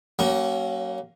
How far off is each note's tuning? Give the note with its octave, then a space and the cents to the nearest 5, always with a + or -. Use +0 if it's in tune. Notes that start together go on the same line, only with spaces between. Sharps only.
F#3 +35 A#3 +0 C#4 +0